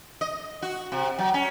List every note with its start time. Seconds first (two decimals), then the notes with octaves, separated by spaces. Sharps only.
0.21 D#5
0.62 F#4
0.92 C3
1.18 F#3
1.34 C#4